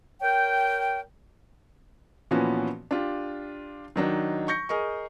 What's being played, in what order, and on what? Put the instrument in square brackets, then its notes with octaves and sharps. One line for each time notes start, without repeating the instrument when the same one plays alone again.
[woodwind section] A#4 C#5 G5
[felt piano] A#2 E3 F3 B3 C#4 F#4
D4 F4 G4
D#3 F#3 D4 D#4
C#6 G6 A#6 C#7
G#4 A#4 D#5 C#6